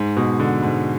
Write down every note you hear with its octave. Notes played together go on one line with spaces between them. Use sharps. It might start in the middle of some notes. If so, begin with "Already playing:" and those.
Already playing: G#2
B2
D3
G#2